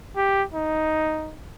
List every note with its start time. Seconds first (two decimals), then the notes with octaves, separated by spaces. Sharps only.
0.16 G4
0.54 D#4